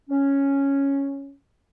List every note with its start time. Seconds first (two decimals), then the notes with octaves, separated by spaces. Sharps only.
0.09 C#4